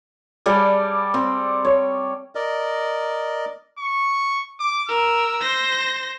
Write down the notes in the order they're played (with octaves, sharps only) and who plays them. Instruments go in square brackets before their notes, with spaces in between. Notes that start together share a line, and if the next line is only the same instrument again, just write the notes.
[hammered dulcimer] G3 A4 D5 G#5
C4
C#5
[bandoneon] A#4 D5 D#5
[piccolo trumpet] C#6
D6
[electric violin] A#4 [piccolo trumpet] E6
[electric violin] C5 A#6